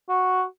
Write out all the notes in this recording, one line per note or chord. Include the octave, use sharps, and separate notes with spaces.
F#4